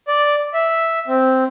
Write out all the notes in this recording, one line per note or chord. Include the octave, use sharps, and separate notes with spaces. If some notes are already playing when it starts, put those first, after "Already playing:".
D5
E5
C4